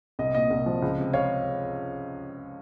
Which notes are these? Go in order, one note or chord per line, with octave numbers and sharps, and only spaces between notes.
C2 D#5
A#2 D#5
C2
F3
C#2
C3
C#5 F5